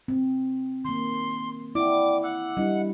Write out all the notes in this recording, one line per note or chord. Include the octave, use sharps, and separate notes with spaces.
C4
D#3 A#3 C6
E4 D5 F#5 G5 D6
F#5 D6 E6
G3 D4 E4 D#5